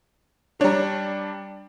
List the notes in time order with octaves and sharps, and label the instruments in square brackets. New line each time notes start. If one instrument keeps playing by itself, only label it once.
[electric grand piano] G3 D4 [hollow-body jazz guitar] C#5 A#5